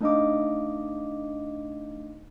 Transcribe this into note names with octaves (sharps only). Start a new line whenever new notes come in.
A3 D4 D#4 D#5 F5 D6